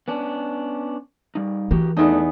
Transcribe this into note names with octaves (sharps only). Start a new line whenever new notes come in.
B3 C#4 D4
G3 D#4
E3 F#4 G4 A#4
E2 A3 D4 D#4